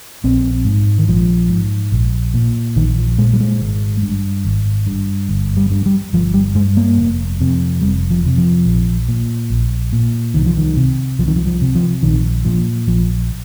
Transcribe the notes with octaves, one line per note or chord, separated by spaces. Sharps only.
A#1 C4
G#2
D#3
A#1 F3
G#2
A#1
A#2
A#1 D#3
F3
A#2 G#3
G3
G#3
G#1
G2
G#1
G2
G1
G3
G2
G3
G1 F3
G3
G2 G#3
A#3
F1
F2 C3
F1 G3
F3
F2 C3
F3
A#1
A#2
A#1
A#2
C2 D#3
F3
D#3
C3
C2 F3
D#3
F3
F3
C3
F3
A#1 D#3
A#2 F3
A#1 F3